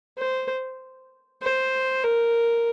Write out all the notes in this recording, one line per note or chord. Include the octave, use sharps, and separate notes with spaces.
C5
C5
A#4